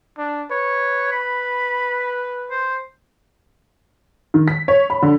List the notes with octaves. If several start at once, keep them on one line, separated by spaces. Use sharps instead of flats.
D4
B4 C#5
B5
C5
D#3
B6
C#5
B5
D3